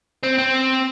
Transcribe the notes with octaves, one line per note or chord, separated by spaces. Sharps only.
C4
C4